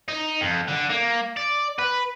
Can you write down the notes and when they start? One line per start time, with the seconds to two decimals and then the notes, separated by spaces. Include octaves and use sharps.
0.08 D#4
0.41 F2
0.68 D3
0.89 A#3
1.37 D5
1.79 B4